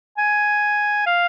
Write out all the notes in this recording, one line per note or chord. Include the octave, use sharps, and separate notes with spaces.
G#5
F5